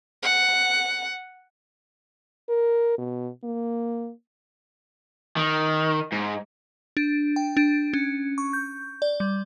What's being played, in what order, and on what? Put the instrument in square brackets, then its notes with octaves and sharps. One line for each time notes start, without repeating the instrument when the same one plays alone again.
[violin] F#5
[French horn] A#4
B2
A#3
[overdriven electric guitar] D#3
G#2
[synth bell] D4
G5
D4
C#4
C#6
G6
D5
G3